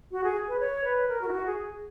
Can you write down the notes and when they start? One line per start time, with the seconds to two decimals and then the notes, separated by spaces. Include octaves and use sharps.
0.12 F#4
0.24 G#4
0.48 B4
0.60 C#5
0.84 B4
1.08 A#4
1.21 F#4
1.28 E4
1.33 F#4
1.46 G#4